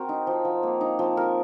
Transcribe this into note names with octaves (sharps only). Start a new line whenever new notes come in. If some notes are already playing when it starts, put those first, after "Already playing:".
Already playing: C4 F#4 A#4
D#4
F3
F3
A#3
D#4
F3
A#4